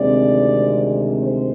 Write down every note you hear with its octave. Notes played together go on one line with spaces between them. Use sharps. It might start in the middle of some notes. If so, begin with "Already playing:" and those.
Already playing: D2 C3 D#3 G#3 C4 D5
C5